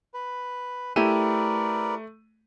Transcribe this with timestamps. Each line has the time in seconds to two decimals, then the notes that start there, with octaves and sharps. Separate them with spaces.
0.14 B4
0.96 A3 E4 G4 A#4 B4 D5 D#7